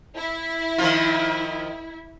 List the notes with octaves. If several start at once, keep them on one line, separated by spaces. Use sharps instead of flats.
E4
D#3 F3 F4